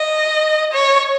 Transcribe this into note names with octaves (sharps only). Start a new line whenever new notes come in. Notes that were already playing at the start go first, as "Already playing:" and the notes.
Already playing: D#5
C#5